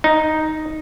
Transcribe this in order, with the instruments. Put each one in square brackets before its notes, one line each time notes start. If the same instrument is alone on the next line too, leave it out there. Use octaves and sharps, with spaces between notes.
[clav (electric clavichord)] D#4